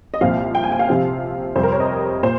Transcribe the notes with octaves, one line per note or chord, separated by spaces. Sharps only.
D#5
C2 A#2 F3 C4 F5
G5
G#5
G5
F5
C3 F3 C4
F2 C3 G3 C4 C5
A#4
C#5
D#5
A#2 C5